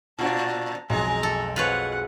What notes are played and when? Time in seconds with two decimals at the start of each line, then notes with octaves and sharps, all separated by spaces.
0.19 A#2 D4 F4 F#4 F#5 A5 A#5
0.90 B1 F2 G#3 G#4 A#5
1.23 A4
1.56 C4 F4 B4 C#5 F#5